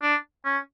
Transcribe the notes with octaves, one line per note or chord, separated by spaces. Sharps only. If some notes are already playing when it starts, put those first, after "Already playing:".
D4
C#4